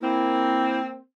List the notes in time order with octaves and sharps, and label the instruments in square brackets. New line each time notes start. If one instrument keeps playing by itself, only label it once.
[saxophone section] A#3 C4 [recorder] E4